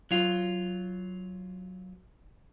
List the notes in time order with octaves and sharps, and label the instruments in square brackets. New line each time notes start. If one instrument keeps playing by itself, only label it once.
[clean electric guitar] F#3 F4